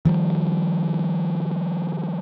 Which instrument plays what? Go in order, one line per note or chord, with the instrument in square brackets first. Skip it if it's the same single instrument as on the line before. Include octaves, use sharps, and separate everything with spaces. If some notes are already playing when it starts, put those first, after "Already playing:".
[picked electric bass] D#3 F3 G3